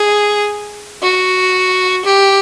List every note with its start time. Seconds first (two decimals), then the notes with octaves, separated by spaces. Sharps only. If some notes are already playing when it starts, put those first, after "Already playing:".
Already playing: G#4
1.02 F#4
2.05 G4